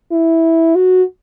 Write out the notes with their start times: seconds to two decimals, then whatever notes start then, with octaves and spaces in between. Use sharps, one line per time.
0.11 E4
0.75 F#4